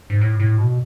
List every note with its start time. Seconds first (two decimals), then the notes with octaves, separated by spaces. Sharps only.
0.10 G#2
0.21 A2
0.40 A2
0.58 B2